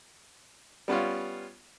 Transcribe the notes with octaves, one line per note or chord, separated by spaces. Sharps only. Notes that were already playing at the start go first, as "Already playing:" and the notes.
G3 B3 C#4 F4